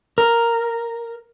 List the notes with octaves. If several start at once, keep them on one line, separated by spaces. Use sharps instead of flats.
A#4